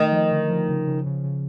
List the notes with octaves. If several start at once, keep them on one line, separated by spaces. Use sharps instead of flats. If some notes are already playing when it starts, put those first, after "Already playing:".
Already playing: D#3 A3
F3
D3
F3
C#3
C#3
C#3
C#3